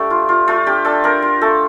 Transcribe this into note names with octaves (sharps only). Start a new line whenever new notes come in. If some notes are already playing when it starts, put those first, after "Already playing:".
Already playing: A3 D4 G4
F4
F4
A3 F4
D4 G4
D4 A4
D4 A#4
F4
A3 A4